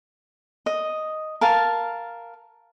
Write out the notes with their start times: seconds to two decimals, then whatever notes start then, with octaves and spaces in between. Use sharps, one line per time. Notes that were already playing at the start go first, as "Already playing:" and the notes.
0.66 D#5
1.41 A#4 F5 A5